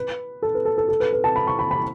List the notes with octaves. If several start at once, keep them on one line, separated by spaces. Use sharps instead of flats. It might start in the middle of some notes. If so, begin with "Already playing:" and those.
Already playing: B4
A4
B4
A4
A4
A4
B4
B4
A5
B5
C#6
B5
B5